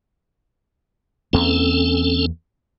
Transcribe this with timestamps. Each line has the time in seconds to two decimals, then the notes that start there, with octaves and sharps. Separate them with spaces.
1.33 E2 A#3 C4 C#4 A4